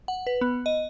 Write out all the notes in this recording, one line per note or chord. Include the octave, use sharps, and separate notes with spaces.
F#5
B4
B3
D#5